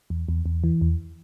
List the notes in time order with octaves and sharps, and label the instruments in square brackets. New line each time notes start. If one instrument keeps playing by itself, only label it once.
[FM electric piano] E2
E2
E2
E3
E2